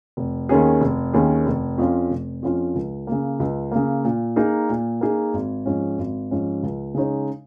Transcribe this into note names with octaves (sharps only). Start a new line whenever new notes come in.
F1
D#2 D#3 C#4 G#4
F1
D#2 D#3 C#4 G#4
F1
F2 F3 C#4 F4
F1
F2 F3 C#4 F4
C#2
C#3 A#3
C#2
C#3 A#3
A#2
A#3 D#4 G#4
A#2
A#3 D#4 G#4
G#1
G#2 F3 C#4
G#1
G#2 F3 C#4
C#2
C#3 G#3 D#4 C#5